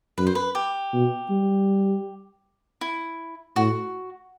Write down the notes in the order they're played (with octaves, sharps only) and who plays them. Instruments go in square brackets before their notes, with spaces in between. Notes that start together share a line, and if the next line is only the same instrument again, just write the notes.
[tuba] F#2 [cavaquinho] B4
[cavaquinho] C5
B4
G4
[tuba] B2
G3
[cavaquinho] E4
[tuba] A2 [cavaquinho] F#4